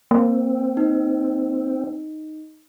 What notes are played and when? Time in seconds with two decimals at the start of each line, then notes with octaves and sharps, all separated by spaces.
0.11 A#3 C4
0.77 D#4